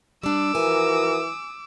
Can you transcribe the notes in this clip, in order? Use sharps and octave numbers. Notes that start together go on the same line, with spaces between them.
G3 D4 D6 E6
E3 F3 F#4 A#4 G#5